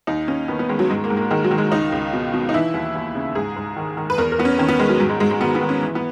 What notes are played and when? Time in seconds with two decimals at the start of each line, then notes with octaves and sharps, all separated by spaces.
0.07 D#2 D#4
0.28 D#2 C#4
0.48 D#3 B3
0.59 B3
0.69 D#3 G#3
0.79 F#3
0.89 G#2 G#3
1.04 A#3
1.10 G#2
1.17 A#3
1.31 D#3 G#3
1.44 F#3
1.51 D#3
1.58 G#3
1.72 C#2 D#4
1.92 C#2
2.13 B2
2.34 B2
2.49 D#4
2.54 E3 E4
2.74 D#2
2.95 D#2
3.15 C#3
3.35 G#2 G#4
3.56 G#2
3.77 D#3
3.97 D#3
4.10 B4
4.18 E2 A#4
4.32 A#4
4.39 E2 B3
4.45 C#4
4.59 D#3 C#4
4.69 B3
4.79 D#3 G#3
4.89 F#3
5.00 G#2 F#3
5.10 G#3
5.20 G#2 G#3
5.31 G#3
5.41 D#3 B3
5.55 B3
5.61 D#3
5.69 C#4
5.82 E3
5.95 B3